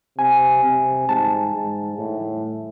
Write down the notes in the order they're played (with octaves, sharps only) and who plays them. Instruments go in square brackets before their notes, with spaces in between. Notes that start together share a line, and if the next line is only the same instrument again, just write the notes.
[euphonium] C3 [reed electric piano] G#5
[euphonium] C3
[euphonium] G#2 [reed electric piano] A5
[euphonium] G#2
A2